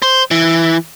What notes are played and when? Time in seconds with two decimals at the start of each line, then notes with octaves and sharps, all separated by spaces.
0.02 C5
0.31 E3